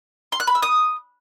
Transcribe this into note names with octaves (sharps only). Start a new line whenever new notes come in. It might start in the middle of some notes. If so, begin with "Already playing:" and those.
C6
F#6
B5
E6
D#6